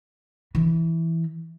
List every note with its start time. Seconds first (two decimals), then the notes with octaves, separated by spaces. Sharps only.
0.55 E3